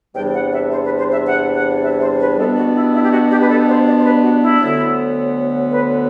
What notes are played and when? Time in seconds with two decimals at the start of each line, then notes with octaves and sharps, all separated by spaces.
0.14 E2 C3 G3 D4 G5
0.33 F#5
0.52 E5
0.70 C5
0.84 B4
0.98 C5
1.11 E5
1.26 F#5
1.54 F#5
1.82 E5
2.00 C5
2.18 B4
2.37 B2 G3 B3 D4 A4
2.55 F#4
2.74 E4
2.93 E4
3.03 G4
3.11 F#4
3.30 G4
3.41 B4
3.49 A4
3.67 C5
3.86 D5
3.98 C5
4.04 B4
4.22 F#4
4.41 E4
4.59 D2 D3 F#3 B3
5.71 B4